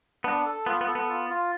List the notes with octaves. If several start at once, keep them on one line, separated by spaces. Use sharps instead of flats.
B3 D4
A4
B3 F4
B3
A4
B3
F4
F4